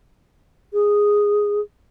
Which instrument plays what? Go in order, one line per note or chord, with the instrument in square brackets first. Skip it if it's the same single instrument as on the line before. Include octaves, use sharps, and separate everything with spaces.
[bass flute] G#4